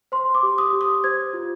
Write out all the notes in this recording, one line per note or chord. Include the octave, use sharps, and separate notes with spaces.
C5 C6
D6
G4
D#6
G4
D#6
C5 G#6
F4